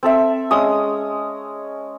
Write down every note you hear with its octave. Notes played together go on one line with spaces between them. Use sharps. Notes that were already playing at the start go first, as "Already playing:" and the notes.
C4 A4 E5
G#3 C#4 D#6